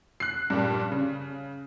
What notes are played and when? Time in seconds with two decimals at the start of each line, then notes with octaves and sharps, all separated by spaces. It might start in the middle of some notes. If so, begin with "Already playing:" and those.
0.20 F#6 C7
0.50 G2 A#2 G3
0.92 C#3